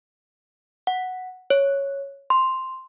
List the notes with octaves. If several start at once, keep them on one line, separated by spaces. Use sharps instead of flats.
F#5
C#5
C6